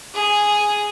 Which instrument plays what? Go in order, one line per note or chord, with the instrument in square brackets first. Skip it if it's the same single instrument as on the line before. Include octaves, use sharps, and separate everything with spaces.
[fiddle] G#4